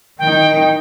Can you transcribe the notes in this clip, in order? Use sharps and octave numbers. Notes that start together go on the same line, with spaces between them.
D#3 D#4 G5